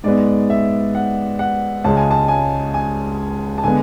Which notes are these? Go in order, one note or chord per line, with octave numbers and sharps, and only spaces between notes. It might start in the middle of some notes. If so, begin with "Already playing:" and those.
G#2 G#3 B3 D5
E5
F#5
F#5
C#2 C#3 G#3 A5
G#5
A5
G#5
G#5
A5
D3 G#3 B3 G#5